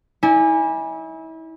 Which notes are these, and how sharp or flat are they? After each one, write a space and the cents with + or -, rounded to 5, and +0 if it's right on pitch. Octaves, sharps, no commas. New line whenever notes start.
E4 -35 D5 +0 G#5 -10